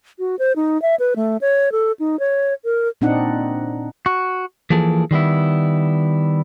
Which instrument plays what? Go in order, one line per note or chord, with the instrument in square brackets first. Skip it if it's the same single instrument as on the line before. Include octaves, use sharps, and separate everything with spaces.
[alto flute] F#4
C5
D#4
E5
B4
A3
C#5
A4
D#4
C#5
A#4
[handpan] A#2 C4 D4 D#4 F#5
[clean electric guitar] F#4
E3 F3 A#3 G#4 A4
D#3 G3 B3 E4